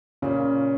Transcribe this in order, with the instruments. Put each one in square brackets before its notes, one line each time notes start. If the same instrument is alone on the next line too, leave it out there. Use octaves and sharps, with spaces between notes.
[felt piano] A#2 C#3 [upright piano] C#4